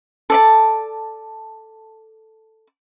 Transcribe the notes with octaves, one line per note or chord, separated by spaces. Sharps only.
A4 D5 A5